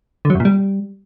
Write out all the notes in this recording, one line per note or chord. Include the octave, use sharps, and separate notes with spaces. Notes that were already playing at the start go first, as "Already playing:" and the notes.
D3
F#3
F#2
A#2
G3